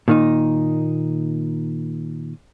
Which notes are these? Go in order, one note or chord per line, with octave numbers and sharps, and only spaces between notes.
A#2 D#3 D#4